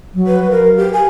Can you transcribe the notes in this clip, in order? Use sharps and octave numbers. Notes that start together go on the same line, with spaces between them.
F#3
B4
A#4 F5
G4
G#5